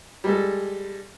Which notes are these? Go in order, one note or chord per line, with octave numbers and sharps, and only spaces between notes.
G3 G#3 A4